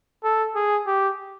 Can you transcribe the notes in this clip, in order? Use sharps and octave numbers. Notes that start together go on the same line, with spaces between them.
A4
G#4
G4